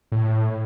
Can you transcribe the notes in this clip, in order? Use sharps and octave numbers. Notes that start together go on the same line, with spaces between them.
A2